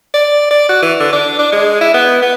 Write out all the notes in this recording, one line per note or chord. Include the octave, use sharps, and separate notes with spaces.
D5
D5
F#4
E3
D3
D4
D4
G#3
E4
B3
B3